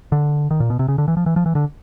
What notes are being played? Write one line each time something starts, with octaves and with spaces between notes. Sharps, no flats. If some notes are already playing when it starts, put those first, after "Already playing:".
D3
D#3
A#2
B2
C3
C#3
D3
E3
F3
E3
F3
E3
D3